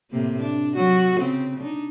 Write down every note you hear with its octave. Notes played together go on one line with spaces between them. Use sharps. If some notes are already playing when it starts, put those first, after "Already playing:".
A2 C3 A#3
D4
F#3 F#4
C#3 C4
D4 D#4